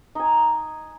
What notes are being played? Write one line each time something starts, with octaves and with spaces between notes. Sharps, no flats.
D#4 G#5